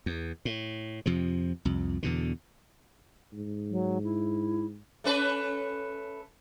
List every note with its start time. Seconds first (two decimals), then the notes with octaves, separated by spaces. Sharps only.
0.06 E2
0.45 A2
1.06 F2 C3 F3
1.65 C2 F2
2.03 E2 B2 D3
3.33 G#2
3.71 F#3
4.04 E4
5.04 A3 C#4 B4